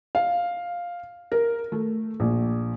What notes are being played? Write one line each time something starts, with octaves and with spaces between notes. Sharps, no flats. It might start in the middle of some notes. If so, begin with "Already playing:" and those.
F5
A#4
A3
A#1